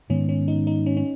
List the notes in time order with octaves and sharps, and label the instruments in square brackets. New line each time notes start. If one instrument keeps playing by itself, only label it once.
[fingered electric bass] G#2 D#3 B3 [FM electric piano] C#4
[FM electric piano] C#4
D#4
D#4
C#4
C#4